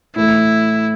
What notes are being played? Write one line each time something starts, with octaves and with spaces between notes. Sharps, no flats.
A2 E3 A3 E4